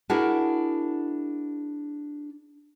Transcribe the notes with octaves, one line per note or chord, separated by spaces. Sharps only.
D4 E4 F#4 G#4 A#4